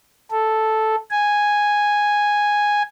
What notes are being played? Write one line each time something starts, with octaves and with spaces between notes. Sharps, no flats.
A4
G#5